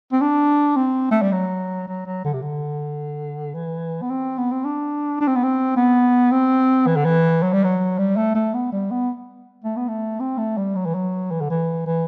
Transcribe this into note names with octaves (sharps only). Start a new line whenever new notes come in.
C4
D4
C4
A3
G3
F#3
F#3
F#3
D3
C3
D3
E3
B3
C4
B3
C4
D4
D4
C4
B3
C4
B3
C4
E3
D3
E3
F#3
G3
F#3
G3
A3
A3
B3
G3
B3
A3
B3
A3
C4
A3
G3
F#3
E3
F#3
E3
D3
E3
E3